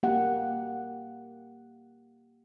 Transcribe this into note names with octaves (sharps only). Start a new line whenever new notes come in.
A#3 G4 F#5